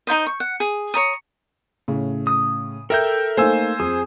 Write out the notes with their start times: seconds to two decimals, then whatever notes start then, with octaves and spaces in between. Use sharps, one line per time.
0.07 D#4 E4 C5 D#5
0.27 C#6
0.40 F#5
0.60 G#4
0.94 C#5 A#5 D#6
1.88 A2 C#3
2.27 D#6
2.90 A4 A#4 E5 G5 G6 A#6
3.37 A3 A#3 D#4 C5 G#5 E6
3.80 F2 G#4